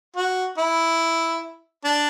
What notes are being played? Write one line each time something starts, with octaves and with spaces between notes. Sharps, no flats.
F#4
E4
D4